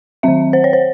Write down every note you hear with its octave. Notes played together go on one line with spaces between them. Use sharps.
D#3 F#3 C4 E5
C5
C#5
C5